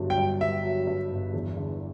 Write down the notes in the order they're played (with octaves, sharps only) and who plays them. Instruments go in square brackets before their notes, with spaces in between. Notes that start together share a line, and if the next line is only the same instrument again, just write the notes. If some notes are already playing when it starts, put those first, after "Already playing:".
Already playing: [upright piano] G1 G2 F#3
[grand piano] G5
[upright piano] G2
[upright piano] G2 [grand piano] E5
[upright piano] F#3
G2
G1
E2
D3